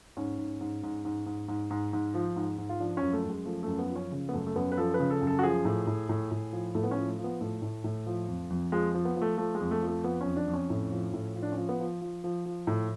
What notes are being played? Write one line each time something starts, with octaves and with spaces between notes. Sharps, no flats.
G#2 C#4
G#2
G#2
G#2
G#2
G#2
G#2
G#2
G#2
F3
G#2
G#2
F4
F3 D4
F#2 C#4
A3
F#2
G#3
F3 A3
F#2 A3
B3
F3
C#4
C#3
B3
F#2 A3
A3
F#2 B3
B4
F3 A4
B4
C#3
A4
F#2
A4
F#4
F3 G#4
A2
A2
A2
A2
F3
A2 A3
B3
C#4
F3
A3
F3
B3
A2 A3
A2
A2
F3
F2
F2
F3 G#3
F3
B3
F3
A3
F3 A3
G#3
F2
A3
F3
A3
F3 B3
F2 C#4
D4
F2
C#4
A2
F3
A2
F3
D4
C#4
F3
B3
F3
F3
F3
F3
A2